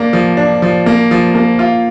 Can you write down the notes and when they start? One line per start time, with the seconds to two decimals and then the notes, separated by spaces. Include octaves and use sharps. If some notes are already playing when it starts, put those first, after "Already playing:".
Already playing: A#3 D4
0.13 F3
0.37 D4
0.62 F3
0.86 A#3
1.11 F3
1.34 A#3
1.59 F4